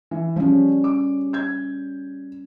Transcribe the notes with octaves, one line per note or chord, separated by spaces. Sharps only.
E3
F3 G3 C#4
D6
G6 G#6